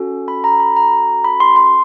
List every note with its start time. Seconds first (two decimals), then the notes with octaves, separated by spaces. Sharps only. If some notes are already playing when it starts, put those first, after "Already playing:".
Already playing: C#4 F#4 A4
0.28 B5
0.44 A#5
0.60 B5
0.77 A#5
1.24 B5
1.40 C6
1.56 C6